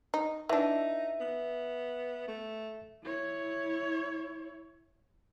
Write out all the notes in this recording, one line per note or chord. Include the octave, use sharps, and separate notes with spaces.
D#4
E3 D4 D#4 E5
B3
A3
E4 C#5